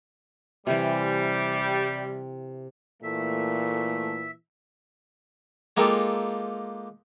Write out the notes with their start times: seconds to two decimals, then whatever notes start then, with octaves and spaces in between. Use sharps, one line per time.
0.67 C3 E3 G3
3.03 A#2 E3 A3 E5
5.77 G#3 A#3 D#4 F4 G4 A4